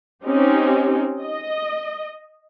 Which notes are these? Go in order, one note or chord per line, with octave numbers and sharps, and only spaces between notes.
C4 C#4 D#4 G4
D#5